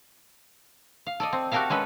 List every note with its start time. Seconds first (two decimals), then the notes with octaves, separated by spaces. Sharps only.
1.06 F5
1.20 A4 D5 D#5
1.33 C4
1.52 F#4 G4 A4 A#4 E5 F5
1.70 G#3 C#4 A4 B4